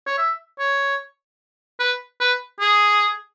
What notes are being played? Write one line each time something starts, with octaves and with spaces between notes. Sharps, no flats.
C#5
E5
C#5
B4
B4
G#4